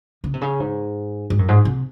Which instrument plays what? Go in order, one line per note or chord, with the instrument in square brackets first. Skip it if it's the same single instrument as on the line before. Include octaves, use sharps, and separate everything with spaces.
[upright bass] C#3
C3
C#3
G#2
G#2
F#2
G#2
C3